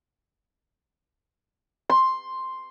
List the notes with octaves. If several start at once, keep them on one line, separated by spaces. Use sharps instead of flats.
C6